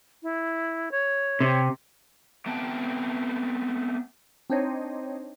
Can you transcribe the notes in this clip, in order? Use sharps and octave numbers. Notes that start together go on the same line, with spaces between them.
E4
C#5
C3
A3 B3 C4 G5 A5
C4 D4 D#4 C5 C#5 D#5